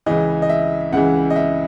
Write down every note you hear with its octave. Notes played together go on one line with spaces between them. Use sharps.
C#2 C#3 E3 D#5
D#5
E5
C#2 C#3 E3 F#5
D#5
E5